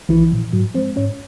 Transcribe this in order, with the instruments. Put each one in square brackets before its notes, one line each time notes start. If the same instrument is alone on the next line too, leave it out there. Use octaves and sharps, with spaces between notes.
[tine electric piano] A#1 E3 E4
A#2 F3
G#2 F#3 F#4
F3 G#3 C4 C5
G#2 C#4 C#5